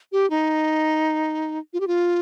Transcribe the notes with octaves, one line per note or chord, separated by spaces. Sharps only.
G4
D#4
F4
G4
F4